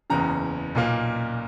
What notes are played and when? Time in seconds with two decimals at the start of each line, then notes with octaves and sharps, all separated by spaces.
0.10 F#1 E2 C#3 A#5
0.75 B1 A#2 A#3